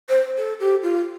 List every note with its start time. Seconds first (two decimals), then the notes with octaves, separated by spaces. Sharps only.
0.09 C5
0.38 A4
0.60 G4
0.82 F4